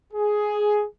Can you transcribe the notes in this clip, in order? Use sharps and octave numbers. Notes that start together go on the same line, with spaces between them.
G#4